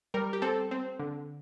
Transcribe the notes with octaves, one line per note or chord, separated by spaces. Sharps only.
G3 A#4
G4
C4 A4
C4
D3